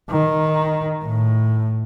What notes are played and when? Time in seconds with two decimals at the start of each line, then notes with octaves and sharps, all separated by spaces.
0.10 D#3
1.05 A2